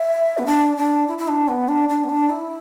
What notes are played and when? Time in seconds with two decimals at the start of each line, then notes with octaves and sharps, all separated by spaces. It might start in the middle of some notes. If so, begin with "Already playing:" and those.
Already playing: E5
0.38 B3
0.46 D4
0.77 D4
1.08 E4
1.18 E4
1.28 D4
1.48 B3
1.68 D4
1.89 D4
2.04 B3
2.09 D4
2.30 E4